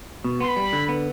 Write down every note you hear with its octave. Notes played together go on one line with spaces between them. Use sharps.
B2
B3 C6
B5
G3
D3
B3